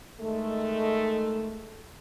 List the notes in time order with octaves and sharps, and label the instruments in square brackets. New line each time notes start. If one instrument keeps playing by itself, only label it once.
[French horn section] D#3 G#3 A3